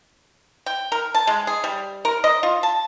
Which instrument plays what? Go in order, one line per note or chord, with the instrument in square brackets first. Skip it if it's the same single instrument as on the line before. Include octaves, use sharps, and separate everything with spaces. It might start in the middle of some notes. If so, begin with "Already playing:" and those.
[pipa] G5
A#4
A5
G#3
G#4
G3
A#4
D#5
F4
A5